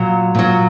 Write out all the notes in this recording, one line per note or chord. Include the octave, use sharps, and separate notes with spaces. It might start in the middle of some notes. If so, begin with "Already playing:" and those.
Already playing: A#2 F#3
A#2 F#3